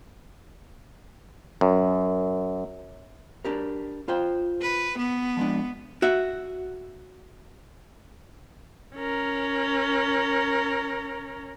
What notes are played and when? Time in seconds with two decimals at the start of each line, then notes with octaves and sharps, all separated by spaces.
1.61 F#2
3.45 D4 G4 A#4
4.08 F4 C5 G5
4.61 B4
4.98 B3
5.37 F3 G#3 D4
6.02 F#4 E5
8.95 C#4 A#4